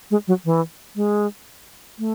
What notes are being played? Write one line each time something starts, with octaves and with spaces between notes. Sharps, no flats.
G#3
F#3
E3
G#3
A3